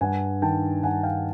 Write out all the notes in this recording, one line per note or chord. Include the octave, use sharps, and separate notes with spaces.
G2 F#5 G#5
D#3 G5 A5
G2 F#5 G#5
F5 G5